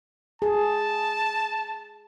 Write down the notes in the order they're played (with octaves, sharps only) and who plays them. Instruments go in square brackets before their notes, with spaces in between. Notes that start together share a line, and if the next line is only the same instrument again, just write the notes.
[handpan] G#4 [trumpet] A5